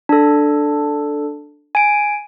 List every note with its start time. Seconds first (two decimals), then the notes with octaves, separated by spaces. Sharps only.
0.09 D4 A4
1.75 G#5 D7